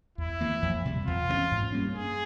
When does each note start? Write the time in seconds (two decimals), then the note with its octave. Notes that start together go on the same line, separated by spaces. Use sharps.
0.18 E2 E4
0.41 E3 A#3
0.62 F2
0.85 C3 G3
1.07 E2 F4
1.29 E3 A#3 C#4
1.51 G#2
1.73 G3 A#3 C#4
1.95 G2 G#4